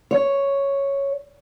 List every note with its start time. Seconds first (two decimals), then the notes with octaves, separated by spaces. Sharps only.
0.11 C#5